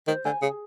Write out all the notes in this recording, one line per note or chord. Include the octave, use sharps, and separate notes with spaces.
D#3 C5
D3 G#5
C#3 G#4